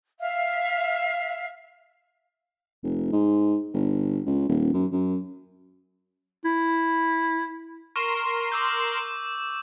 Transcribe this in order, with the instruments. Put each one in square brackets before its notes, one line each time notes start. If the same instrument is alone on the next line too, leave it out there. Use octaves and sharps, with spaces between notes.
[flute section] E5 F5
[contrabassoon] F1
G#2
G1
C#2
D#1
F#2
F#2
[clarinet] E4
[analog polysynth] A#4 C6 [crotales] C#6 E7
[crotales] D6 E6 G6